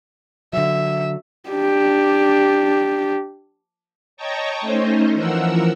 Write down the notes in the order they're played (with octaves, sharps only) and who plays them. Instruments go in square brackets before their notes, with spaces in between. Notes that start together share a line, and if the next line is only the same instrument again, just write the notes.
[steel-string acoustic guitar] D3 F#3 [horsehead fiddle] E5
[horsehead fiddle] D4 G4
[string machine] C#5 D#5 G5 A5 A#5 C#6
A3 C#4 D#4 C5 D#5
E3 F3 A#4 F#5 E6